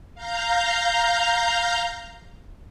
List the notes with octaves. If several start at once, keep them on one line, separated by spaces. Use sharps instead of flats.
F5 A#5 G6